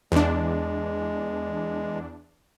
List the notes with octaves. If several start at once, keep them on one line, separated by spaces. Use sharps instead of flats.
E2 G#3 D4